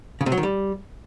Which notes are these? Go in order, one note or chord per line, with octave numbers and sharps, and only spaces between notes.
C#3
C3
F#3
D#3
G3